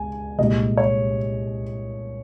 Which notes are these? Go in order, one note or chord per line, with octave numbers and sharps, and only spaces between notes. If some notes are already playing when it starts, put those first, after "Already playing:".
Already playing: C#2 G#5
C2 A#2 G#3 D#5
C#5